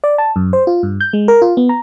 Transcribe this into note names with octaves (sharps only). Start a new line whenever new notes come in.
D5
A5
F#2
C5
F4
G2
G6
G#3
A#4
F4
B3
A#5